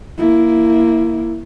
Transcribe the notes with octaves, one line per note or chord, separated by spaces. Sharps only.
A#3 E4